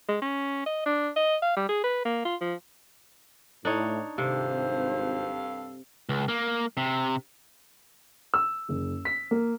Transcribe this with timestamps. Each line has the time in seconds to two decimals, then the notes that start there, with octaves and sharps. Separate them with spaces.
0.08 G#3
0.22 C#4
0.66 D#5
0.85 D4
1.16 D#5
1.42 F5
1.56 G3
1.69 G#4
1.84 B4
2.05 A#3
2.25 F4
2.41 F3
3.65 A2 D4 D#4 C#5
4.18 G#1 G2 C3 A4 C5 F5
6.09 C#2
6.28 A#3
6.77 C3
8.34 E6
8.69 F#1
9.05 B6
9.31 A#3